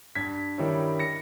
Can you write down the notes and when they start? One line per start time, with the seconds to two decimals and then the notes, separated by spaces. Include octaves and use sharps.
0.15 G2 G#6 B6
0.58 D#3 G3 C#4 E4
0.99 A#6 C#7